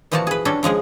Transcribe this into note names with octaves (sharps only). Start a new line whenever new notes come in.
A#2 E3 F3 A3 F#4 A5
G#4 B4
G3 C#4 D4 F#4 A4
C#3 F3 G#3 G#4